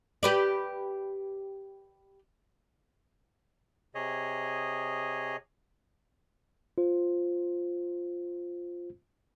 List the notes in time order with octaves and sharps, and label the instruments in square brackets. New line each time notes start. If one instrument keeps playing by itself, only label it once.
[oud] G4 B4 D5
[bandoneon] C3 G#4 C#5 D#5
[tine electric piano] F4 C5